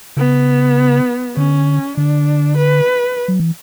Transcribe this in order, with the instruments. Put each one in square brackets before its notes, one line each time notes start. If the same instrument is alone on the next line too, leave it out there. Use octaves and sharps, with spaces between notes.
[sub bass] C#3 [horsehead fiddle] B3
[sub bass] D3 [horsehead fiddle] C#4
[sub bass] D3 [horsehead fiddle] D4
[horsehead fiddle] B4
[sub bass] F#3
E3